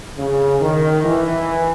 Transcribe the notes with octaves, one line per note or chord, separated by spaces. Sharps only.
C#3
D#3
E3